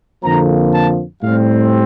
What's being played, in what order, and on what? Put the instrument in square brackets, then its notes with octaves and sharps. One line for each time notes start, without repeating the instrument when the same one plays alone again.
[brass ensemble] F2 D3 F3 A#3 A#5
A5
A2 G3 C4 F5